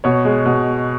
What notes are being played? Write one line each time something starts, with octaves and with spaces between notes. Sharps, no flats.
B2 C#5
G#3
B2